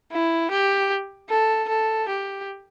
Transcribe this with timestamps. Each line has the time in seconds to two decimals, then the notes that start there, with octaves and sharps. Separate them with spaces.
0.12 E4
0.51 G4
1.30 A4
1.68 A4
2.08 G4